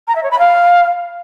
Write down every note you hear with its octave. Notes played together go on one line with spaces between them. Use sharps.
A#5
E5
C#5
B5
F5